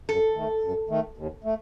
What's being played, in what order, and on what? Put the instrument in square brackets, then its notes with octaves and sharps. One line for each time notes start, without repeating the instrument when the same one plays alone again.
[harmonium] F#2 [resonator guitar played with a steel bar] A4
[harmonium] D#3 A3
F#2
D#3 A3
D#2
A3